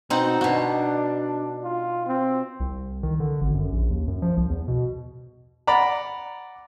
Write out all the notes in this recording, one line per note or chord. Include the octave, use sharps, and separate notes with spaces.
B2 C4 D#4 F#5
B2 D4 F#4
F4
C4
C2
D#3
D3
G#1
F#2
A#1
D#2
F#2
F3
C2
E2
B2
D5 F#5 A#5 B5